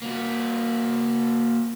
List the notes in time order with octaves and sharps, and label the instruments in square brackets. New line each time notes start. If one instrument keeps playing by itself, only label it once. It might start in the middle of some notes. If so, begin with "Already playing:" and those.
[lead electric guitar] A#3 F#4